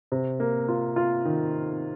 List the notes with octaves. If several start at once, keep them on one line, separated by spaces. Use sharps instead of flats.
C3
A#3
F4
F4
D#3